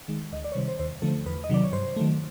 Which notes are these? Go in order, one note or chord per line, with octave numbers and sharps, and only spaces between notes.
D#3 G#3
D2 D#5
D5
C#5
C3 D#3 G3 C5
C5
D#2 C5
D3 F3 A3 A4
E2 B4
D#5
C3 D#3 F#3 D5
C#5
G2 C5
D#3 F#3 A3